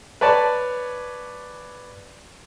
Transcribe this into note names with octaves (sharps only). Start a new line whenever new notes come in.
B4 C#5 D5 A5